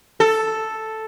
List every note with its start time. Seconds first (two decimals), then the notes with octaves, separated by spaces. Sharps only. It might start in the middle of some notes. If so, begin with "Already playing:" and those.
0.20 A4